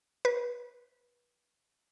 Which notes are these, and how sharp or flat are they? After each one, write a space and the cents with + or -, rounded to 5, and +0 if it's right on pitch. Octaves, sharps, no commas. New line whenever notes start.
B4 -30